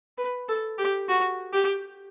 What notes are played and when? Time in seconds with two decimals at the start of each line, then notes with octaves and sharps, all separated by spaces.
0.18 B4
0.48 A4
0.78 G4
1.08 F#4
1.53 G4